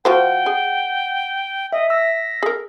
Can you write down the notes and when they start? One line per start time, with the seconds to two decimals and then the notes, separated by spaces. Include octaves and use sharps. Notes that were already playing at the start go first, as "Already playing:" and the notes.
0.05 F3 F#4 C5 F#5 G5
0.46 G#4
1.73 D#5 E5
1.90 E6 A#6 B6
2.43 G#4 A#4